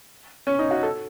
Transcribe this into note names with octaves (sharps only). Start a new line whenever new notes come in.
C#4
D#4
F#4
A4